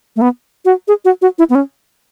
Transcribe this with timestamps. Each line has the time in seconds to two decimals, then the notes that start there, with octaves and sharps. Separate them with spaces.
0.16 A3
0.21 B3
0.65 F#4
0.88 G#4
1.05 F#4
1.22 F#4
1.39 E4
1.50 B3
1.55 C#4